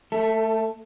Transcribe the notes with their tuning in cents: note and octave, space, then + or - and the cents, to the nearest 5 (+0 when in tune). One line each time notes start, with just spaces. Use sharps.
A3 +0 A4 +30